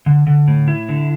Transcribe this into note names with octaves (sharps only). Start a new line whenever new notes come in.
D3
D3
A2
E4
D3